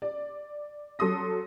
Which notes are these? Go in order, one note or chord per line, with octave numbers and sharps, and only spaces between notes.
D5
F#3 A4 C6 D#6 A#6